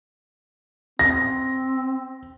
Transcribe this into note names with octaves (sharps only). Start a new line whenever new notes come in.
C4 A#6